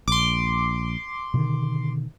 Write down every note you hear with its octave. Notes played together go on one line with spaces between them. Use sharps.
A#1 C6 D6
B2 D3 D#3